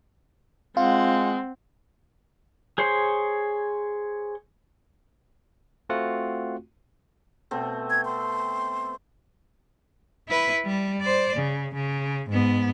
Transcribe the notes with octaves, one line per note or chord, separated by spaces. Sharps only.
G#3 C4 F4 F#5
G#4 C5 C#5 C6
A3 C4 F4 F#4 F#5
B2 A3 C4
G#6
C6
E4 B4
G3
C5 D5
C#3
C#3
G#2 B3